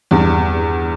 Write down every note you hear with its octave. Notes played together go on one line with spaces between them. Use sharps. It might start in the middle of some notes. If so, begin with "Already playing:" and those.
E2 G2